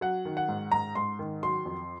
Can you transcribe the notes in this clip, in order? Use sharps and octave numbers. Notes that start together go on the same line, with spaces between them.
F#3 F#5
D#3
F#5
G#2
G#2 A#5
G#2 C6
D#3
F#3 C6
F2